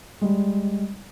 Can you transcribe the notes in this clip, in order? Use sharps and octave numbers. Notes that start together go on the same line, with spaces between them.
G3 G#3